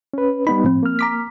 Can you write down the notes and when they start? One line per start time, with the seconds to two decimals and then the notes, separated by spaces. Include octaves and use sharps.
0.14 C#4 B4
0.47 G3 B3 D#4 B5
0.64 A2 F3 C4
0.83 A#3 F6
0.99 A#5 D6 B6